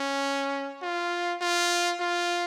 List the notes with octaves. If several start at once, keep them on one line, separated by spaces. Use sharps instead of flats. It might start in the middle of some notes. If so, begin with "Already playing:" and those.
Already playing: C#4
F4
F4
F4